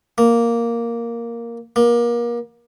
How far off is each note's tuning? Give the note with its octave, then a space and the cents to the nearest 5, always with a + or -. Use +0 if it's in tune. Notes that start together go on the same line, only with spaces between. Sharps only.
A#3 +0
A#3 +30